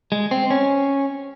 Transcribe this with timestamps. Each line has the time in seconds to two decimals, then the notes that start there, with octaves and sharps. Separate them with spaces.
0.12 G#3
0.31 C4
0.50 C#4